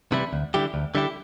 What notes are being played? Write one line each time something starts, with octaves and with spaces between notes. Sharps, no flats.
C3 E3 G3 E4
D2
D3 G3 E4 G4
D2
D3 G3 E4 G4